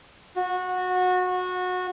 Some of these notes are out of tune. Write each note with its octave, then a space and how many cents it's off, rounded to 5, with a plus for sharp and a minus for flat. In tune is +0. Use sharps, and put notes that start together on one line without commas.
F#4 -20